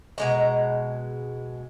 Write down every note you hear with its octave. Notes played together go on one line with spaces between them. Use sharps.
B2 G#3 A#5